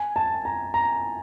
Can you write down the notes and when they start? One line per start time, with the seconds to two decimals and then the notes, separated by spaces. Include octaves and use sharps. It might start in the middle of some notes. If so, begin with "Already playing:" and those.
Already playing: G#5
0.16 A5
0.45 A#5
0.74 A#5